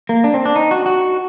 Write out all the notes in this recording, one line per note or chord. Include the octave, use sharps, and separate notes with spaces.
A#3
D4
C4
D4
D#4
F#4
F#4